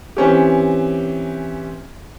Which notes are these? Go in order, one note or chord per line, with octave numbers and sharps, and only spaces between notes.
E3 C4 C#4 G4